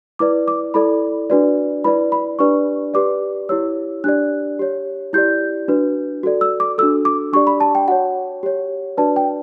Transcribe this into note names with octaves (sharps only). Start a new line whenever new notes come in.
E4 B4 D5 D6
D6
E4 A4 D5 B5
D4 F#4 B4 D5
E4 B4 D5 B5
B5
D4 G4 B4 D5 C#6
G4 B4 D5 D6
E4 G4 C#5 E6
D4 G4 D5 F#6
G4 C#5
E4 G4 D5 G6
D4 F#4 B4
F#4 A4 D5
E6
D6
D4 F#4 A4 E6
D6
D4 G4 D5 C#6
B5
A5
G5
F#4 C#5 F#5
G4 C#5
D4 F#4 B4 D5 A5
G5